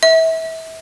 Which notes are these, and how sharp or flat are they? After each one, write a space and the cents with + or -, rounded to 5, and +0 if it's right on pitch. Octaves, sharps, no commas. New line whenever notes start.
E5 -30